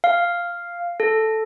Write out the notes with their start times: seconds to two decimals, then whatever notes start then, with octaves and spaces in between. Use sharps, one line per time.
0.04 F5
1.00 A4